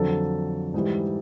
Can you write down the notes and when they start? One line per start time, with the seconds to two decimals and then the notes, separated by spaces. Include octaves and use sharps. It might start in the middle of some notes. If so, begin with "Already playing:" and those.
Already playing: F2 D3 F#3 A4
0.74 G#2 E3 G3